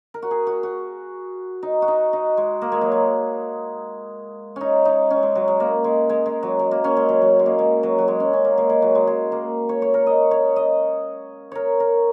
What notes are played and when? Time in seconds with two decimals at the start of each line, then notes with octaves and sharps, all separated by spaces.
0.14 A#4
0.22 F#4
0.31 G#4
0.47 F#4
0.63 F#4
1.63 D#4
1.82 F#4
1.88 D#4
2.13 D#4
2.37 G#3
2.62 A#3
2.72 G#3
2.81 F#3
2.92 G#3
4.56 C#4 D#4
4.85 D#4
5.10 C#4
5.23 G#3
5.35 F#3
5.48 G#3
5.60 A#3
5.84 G#3
6.09 G#3
6.26 G#3
6.43 F#3
6.59 G#3
6.71 A#3
6.84 C#4
6.97 G#3
7.09 F#3
7.22 F#3
7.39 G#3
7.46 A#3
7.59 G#3
7.83 F#3
7.98 F#3
8.08 G#3
8.20 C#4
8.33 C#4
8.45 A#3
8.58 G#3
8.70 G#3
8.82 F#3
8.95 G#3
9.07 G#3
9.32 A#3
9.69 C#5
9.82 C#5
9.94 A#4
10.07 D#5
10.31 C#5
10.56 D#5
11.52 A#4 C#5
11.80 A#4